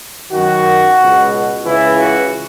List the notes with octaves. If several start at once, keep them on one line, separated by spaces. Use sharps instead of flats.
F#2 D#3 F#4
C#2 B2
C#2 C#3 E3 E4
F#4